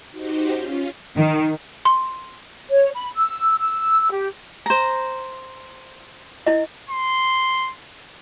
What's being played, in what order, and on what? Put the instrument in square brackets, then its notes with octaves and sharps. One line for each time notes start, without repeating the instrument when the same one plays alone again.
[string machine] D#4 F#4 G4 C5
C#4 F4
[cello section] D#3
[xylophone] C6
[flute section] C#5
B5
E6
E6
G4
[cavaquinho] C5 A#5
[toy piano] E4 D#5
[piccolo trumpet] C6